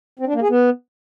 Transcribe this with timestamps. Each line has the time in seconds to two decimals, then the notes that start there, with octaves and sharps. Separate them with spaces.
0.19 C4
0.27 D4
0.34 A#3
0.42 G#4
0.49 B3